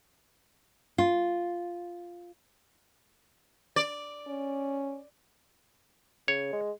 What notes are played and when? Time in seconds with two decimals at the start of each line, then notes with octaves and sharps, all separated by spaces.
0.98 F4
3.76 D5
4.27 C#4
6.28 C#3 C#5
6.53 G#3